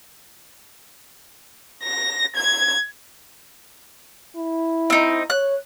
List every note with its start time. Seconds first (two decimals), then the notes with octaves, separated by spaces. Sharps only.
1.83 A#6
2.35 G#6
4.36 E4
4.90 C4 D#4
5.30 C#5 F#6